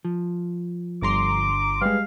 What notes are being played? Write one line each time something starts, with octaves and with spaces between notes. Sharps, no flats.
F3
G1 A#5 C6 D6
G3 G#3 B4 F5